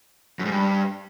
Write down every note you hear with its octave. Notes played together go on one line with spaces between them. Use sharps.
F#2
G#2
G2